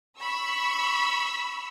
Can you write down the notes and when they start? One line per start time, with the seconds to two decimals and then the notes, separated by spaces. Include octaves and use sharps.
0.18 B5 C#6 E6